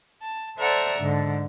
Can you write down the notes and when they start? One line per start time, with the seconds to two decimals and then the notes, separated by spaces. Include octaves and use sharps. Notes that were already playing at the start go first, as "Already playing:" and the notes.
0.22 A5
0.58 A4 C5 D5 E5 F#5 A#5
0.99 G#2 D3